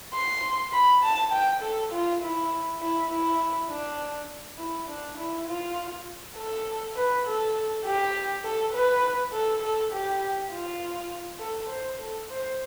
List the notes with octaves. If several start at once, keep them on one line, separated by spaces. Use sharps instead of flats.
C6
B5
A5
G5
A4
F4
E4
E4
E4
D4
E4
D4
E4
F4
A4
B4
A4
G4
A4
B4
A4
A4
G4
F4
A4
C5
A4
C5